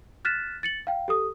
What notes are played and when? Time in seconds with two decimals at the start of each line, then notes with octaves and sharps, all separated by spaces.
0.25 F6 F#6 A6 B6 E7
0.63 A6 C#7 F#7
0.87 F5 G5
1.08 G4 A4 D#6